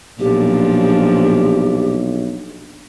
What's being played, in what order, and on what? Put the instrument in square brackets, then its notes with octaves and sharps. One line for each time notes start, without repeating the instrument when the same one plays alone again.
[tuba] B1 [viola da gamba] A#2 F3 D4 [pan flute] G4